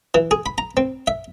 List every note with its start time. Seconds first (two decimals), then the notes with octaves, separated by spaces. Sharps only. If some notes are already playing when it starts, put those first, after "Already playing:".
0.14 E3
0.31 G#4
0.46 B5
0.58 A#5
0.77 C4
1.07 E5